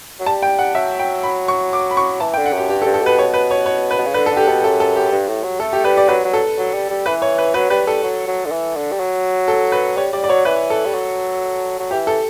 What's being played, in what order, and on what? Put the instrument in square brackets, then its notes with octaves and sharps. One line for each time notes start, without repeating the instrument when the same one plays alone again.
[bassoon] F#3
[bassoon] G3 [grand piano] A5
[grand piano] G5
F#5
[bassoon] F#3 [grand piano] E5
[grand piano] G5
B5
C#6
D6
B5
C#6
[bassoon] E3 [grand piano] A5
[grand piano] G5
[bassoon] D3
[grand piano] F#5
[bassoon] F#2 [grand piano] G4
[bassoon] G2 [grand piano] G4
[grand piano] A4
[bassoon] G2
[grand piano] A4
[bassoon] B2 [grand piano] B4
[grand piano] C#5
B4
C#5
C#5
B4
[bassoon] B2
C#3
[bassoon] D3 [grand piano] B4
[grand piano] A4
[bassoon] D3
[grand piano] G4
[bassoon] B2 [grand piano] A4
[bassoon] F#2 [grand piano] A4
[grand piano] A4
G4
[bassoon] G2
A2
F#3
[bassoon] A3 [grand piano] A4
[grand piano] G4
[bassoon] G3 [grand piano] B4
[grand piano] D5
[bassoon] F#3 [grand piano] B4
[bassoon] F#3
[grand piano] A4
[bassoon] F#3
G3
G3
[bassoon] E3 [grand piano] B4
[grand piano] C#5
B4
[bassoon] F#3 [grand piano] B4
[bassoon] G3 [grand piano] B4
[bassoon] G3 [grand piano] A4
[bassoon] F#3
F#3
D3
E3
D3
G3
F#3
[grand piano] A4
B4
[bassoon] G3 [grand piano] C#5
[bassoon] G3 [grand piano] D5
[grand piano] D5
[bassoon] F#3 [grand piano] C#5
[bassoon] E3 [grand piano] B4
[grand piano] A4
[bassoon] G3
F#3
F#3
[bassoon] E3 [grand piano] G4
[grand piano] A4